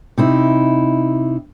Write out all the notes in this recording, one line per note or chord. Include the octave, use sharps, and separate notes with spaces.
C3 D#4 E4